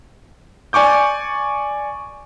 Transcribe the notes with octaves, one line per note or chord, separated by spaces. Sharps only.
D5 G#5 C#6 D6 G6